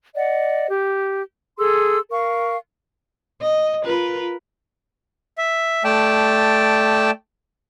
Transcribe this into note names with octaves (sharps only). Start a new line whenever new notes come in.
D5 D#5 F#5
G4
G#4 A4 C6 E6
A#4 F5 C#6
D#5
F4 A#4 B4
E5
A3 D5 G5 A5